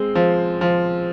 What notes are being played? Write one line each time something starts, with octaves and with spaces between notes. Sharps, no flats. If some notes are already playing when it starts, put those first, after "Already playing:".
Already playing: G#3 C4
F3
F3